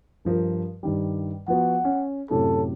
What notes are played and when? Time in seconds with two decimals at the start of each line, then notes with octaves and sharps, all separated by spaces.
0.25 G2 F3 A#4
0.83 G2 D#3 G3
1.48 F3 B3 F#4 F#5
1.84 C#4
2.31 F#2 A2 C3 A4